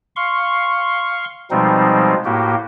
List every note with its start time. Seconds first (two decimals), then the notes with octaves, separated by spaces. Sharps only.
0.16 F5 C6 C#6
1.51 B2 F3 G3 G#3 C4 D#4
2.25 A2 A#3 F#4 G4